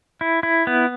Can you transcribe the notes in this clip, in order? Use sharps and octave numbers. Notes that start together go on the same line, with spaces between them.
E4
E4
B3